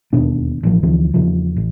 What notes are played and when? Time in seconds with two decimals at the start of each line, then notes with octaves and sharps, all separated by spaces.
0.13 E1 D#2 B2 D4
0.63 A1 A2 F3
0.83 D2 E3 F3
1.14 E2 C#3 F3
1.57 A1